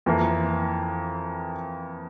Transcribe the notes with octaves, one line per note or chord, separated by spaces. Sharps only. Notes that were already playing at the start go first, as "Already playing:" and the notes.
F2 E3 A#3